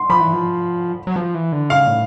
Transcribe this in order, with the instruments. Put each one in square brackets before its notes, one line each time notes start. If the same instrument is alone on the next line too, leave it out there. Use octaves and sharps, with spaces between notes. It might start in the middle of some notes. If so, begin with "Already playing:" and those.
Already playing: [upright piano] C6
[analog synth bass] F3 [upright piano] B5
[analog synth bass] E3
F3
F#3
F3
E3
D3
[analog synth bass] C#3 [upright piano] F5
[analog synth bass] A2